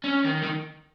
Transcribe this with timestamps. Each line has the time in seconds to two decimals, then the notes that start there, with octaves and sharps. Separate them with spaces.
0.04 C#4
0.25 D#3
0.43 D#3